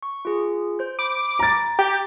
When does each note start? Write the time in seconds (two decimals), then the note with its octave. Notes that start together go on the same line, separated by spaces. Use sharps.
0.03 C#6
0.25 F4 G#4
0.79 C5 G6
0.99 B5 D6
1.39 A#5 A6
1.79 G4